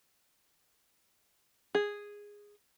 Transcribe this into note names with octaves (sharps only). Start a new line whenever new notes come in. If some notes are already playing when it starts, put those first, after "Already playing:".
G#4